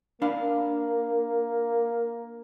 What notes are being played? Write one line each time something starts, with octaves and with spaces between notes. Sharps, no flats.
A#3 D4 F5 B5